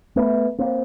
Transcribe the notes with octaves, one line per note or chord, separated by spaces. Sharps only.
A3 B3
A#3 C4